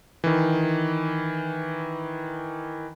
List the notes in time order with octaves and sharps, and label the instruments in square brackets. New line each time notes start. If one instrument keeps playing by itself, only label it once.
[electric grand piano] D#3 E3